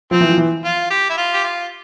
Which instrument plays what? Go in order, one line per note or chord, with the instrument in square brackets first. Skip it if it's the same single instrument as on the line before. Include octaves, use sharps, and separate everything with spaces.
[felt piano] F3 [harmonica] C4
[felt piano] E3
F3
E3
[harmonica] F4
G4
E4
F4
G4
F4